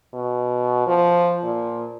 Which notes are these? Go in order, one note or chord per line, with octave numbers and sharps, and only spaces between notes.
B2
F3
A#2